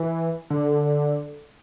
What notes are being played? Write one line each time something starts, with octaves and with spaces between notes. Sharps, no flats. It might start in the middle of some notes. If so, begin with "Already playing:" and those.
Already playing: E3
D3